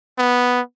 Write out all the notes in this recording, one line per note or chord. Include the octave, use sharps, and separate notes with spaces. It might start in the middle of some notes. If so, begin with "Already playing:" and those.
B3